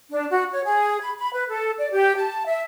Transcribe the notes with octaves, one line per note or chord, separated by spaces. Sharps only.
D4
F#4
C#5
G#4
B5
B5
B4
A4
D5
G4
A5
E5